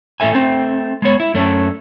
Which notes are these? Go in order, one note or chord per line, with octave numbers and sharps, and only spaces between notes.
A2 E4 A4 E5 G#5
A3 C4
G#3 B3 C#5
E4
F#2 A3 C#4 D4